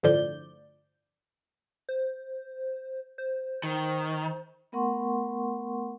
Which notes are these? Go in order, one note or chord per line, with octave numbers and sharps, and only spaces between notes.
G1 A2 D3 F3 D5 G6
C5
C5
D#3
A3 B3 A#4 F#5 C6 C#6